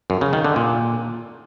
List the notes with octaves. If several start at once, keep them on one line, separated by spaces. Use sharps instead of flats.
F#2
C#3
D#3
D3
A#2